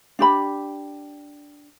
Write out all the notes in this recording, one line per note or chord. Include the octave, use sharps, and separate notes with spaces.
D4 G4 B5